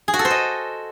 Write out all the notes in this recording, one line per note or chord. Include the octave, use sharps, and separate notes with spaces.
G#4
F#4
A4
C5
D#5